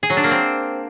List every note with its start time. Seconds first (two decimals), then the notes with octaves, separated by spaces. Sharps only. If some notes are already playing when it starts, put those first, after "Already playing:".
0.03 G#4
0.10 F#3
0.17 D4
0.24 A#3
0.31 C4